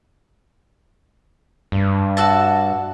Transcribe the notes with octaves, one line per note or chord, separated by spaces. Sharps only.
G2
F#4 E5 A5